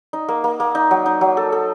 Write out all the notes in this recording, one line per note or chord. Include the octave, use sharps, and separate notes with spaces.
D#4
A#3
A#3
A#3
D#4
F#3
D#4
F#3
A4
A4